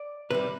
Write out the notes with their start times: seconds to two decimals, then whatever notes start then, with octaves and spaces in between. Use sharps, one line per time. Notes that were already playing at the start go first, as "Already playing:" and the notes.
Already playing: D5
0.31 C3 G3 B4